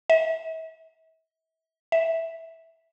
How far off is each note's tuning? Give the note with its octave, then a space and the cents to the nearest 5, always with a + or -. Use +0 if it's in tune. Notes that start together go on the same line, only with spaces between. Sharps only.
E5 -35
E5 -5